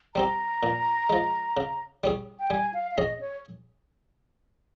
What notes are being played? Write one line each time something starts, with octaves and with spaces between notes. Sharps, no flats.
G3 C4 G4 A#5
A#2
F3 G#3
C#3
G3 C#4 G#4
G5
G3 G#5
F5
F5
C#4 G#4 D#5
C#5